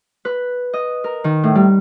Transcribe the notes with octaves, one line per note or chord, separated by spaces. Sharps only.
B4
D#5
A#4
D#3
A2
G3